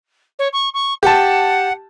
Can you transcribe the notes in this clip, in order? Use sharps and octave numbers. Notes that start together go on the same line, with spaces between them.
C#5
C#6
C#6
G4 F#5 A5